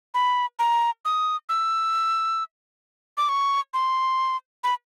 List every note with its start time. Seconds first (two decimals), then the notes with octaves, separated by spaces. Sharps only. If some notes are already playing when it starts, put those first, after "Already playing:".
0.14 B5
0.59 A#5
1.05 D#6
1.49 E6
3.17 D6
3.29 C#6
3.74 C6
4.64 B5